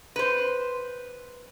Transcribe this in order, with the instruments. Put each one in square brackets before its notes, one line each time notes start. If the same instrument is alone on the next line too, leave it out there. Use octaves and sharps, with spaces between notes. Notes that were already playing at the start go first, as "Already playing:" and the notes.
[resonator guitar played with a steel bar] B4 C5